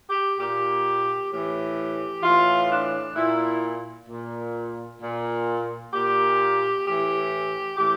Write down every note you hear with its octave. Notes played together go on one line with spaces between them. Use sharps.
G4
A#2 G4
A2 E3 G4
A2 E3 F4
D4
A#2 E4
A#2
A#2
A#2 G4
A2 E3 G4
A2 E3 G4